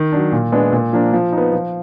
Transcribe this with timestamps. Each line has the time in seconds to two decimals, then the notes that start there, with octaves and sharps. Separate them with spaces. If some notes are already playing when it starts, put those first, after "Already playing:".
Already playing: D#3
0.12 F#3 D4
0.32 A#2
0.52 G#3 B3 D4
0.72 A#2
0.93 F3 A#3 D4
1.13 F3
1.32 D#4
1.38 B3
1.53 F3